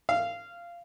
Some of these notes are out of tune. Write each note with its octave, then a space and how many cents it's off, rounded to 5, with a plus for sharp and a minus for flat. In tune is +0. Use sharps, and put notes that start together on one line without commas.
F5 -15